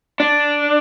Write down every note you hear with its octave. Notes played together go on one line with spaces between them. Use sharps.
D4